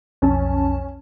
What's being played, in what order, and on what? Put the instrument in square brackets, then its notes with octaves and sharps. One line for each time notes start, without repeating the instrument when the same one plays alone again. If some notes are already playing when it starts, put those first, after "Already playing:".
[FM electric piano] B1 F2 A5 [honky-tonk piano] C#4